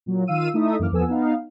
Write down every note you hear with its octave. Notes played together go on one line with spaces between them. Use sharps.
A#2 F#3
D#3 F4 F5 E6 D#7
A3 D#4 E4 A4 E5 D#6
F#2 E3 A#3 D6 F6
E2 F3 B3 A4 G#5 E6
B3 D#4 F5